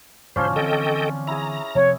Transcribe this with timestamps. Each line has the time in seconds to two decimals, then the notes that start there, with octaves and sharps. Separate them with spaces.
0.36 E1 G#2 D3 F3 C#4 C5 D5
0.56 D3 E3 C4 A4 D#5 G5
1.27 E4 G#4 A#5
1.75 C3 F3 C#5